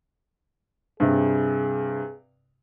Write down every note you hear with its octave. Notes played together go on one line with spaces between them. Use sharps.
G2 C3 G#4